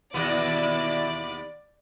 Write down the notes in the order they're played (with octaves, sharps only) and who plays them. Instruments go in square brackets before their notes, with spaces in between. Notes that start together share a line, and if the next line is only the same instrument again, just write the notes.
[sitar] D#2 B3 [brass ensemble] B2 E4 [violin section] D5